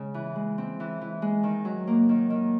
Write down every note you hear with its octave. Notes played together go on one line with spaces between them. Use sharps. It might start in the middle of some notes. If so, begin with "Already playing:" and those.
Already playing: C#3 G#3
E3
G#3
C4
E3
E3
G#3
D#3
F#3
A#3
D#3
D#3